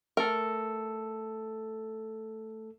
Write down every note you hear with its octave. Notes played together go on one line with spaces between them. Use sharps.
A3 A4 A#4